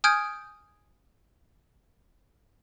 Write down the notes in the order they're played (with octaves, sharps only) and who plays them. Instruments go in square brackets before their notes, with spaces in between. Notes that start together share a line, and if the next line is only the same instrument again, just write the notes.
[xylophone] G#5 D#6 F6 G6 G#6 D7